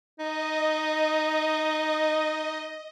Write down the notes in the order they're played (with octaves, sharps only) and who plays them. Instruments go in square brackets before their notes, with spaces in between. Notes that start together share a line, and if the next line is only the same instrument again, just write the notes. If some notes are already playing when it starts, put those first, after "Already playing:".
[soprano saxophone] D#4 [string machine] D#5